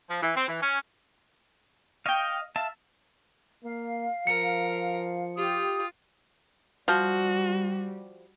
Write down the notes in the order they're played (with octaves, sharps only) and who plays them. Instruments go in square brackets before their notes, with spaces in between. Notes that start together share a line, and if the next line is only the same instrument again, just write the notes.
[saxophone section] F3
E3
C4
E3
C#4
[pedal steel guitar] D#5 F5 [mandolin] G5 C#6
[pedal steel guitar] E5 A5 [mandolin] F5
[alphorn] A#3 [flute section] F5
[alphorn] F3 [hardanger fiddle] A#4 [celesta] C#7
[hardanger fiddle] F4 [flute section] G4 D#6
[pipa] F3 [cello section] G3 [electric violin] F#4